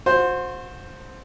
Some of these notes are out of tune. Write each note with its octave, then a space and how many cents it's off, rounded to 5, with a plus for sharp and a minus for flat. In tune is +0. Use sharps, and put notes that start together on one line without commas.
F#4 -35 C5 +0